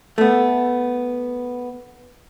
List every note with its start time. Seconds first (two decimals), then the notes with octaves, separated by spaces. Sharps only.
0.18 A3 B3